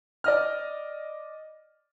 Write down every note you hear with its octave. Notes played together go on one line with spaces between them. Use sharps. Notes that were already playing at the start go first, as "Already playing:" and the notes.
D5 D#5 F6